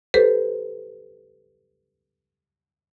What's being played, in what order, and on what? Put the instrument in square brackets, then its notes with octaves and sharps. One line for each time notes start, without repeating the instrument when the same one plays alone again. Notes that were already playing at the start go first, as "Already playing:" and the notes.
[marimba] G4 A4 B4 C5